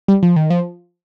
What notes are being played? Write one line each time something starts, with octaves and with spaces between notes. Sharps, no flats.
G3
F3
D#3
F3